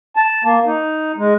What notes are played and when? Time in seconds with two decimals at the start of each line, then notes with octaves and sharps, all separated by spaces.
0.16 A5
0.45 A#3
0.66 D#4
1.18 G#3